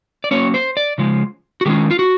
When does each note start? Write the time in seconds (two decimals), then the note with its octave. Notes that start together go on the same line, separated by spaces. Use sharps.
0.24 D5
0.31 F#3 A#3 C#4 C#5
0.54 C5
0.77 D5
0.98 C#3 F3 G#3
1.61 F#4
1.66 D#3 G#3 C#4 F4 G4
1.91 F4
1.99 F#4